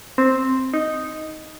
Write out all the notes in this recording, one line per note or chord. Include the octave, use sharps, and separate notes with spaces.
C4
D#4